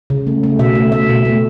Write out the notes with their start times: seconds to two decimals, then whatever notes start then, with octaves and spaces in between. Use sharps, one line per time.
0.10 C#3
0.27 A3
0.43 A3
0.59 B2 E5
0.75 A3
0.92 A3 E5
1.09 B2
1.25 A3